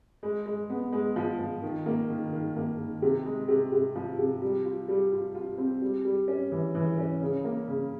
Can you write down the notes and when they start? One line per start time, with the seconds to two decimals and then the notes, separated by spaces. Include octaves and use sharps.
0.23 G#3
0.46 G#3
0.70 B3
0.92 G#3
1.16 F3
1.39 F3
1.62 D#3
1.86 A#3
2.09 D#3
2.33 D#3
2.56 A#3
2.78 D#3
3.02 C3
3.25 G#3
3.48 C3
3.72 C3
3.95 F3
4.19 C3
4.42 G3
4.65 F4
4.88 G3
5.12 F4
5.35 F4
5.58 C4
5.81 G3
6.05 G3
6.28 C#4
6.52 E3
6.75 E3
6.98 C#4
7.21 C#3
7.44 A#3
7.68 C#3